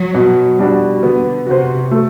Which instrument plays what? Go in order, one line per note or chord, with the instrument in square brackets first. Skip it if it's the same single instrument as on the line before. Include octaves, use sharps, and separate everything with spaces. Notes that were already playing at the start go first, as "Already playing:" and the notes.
Already playing: [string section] F#3
[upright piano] B2
G3 D4 F#4
[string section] D3 [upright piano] B3
[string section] C3 [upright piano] F#4 C5
[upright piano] A3